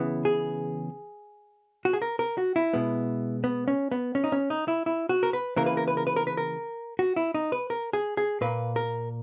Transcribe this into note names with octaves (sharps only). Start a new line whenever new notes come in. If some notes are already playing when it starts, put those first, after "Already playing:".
Already playing: C#3 E3 B3
G#4
F#4
G#4
A#4
A#4
F#4
E4
B2 G#3 B3
B3
C#4
B3
C#4
D#4
C#4
D#4
E4
E4
F#4
A#4
B4
C#3 E3 A#3 A#4
B4
A#4
B4
A#4
B4
A#4
B4
A#4
F#4
E4
D#4
B4
A#4
G#4
G#4
A#2 A#3 B4
A#4